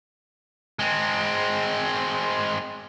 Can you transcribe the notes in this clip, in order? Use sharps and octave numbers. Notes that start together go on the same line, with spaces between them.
G#3 C4